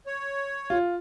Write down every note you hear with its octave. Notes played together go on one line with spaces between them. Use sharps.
C#5
F4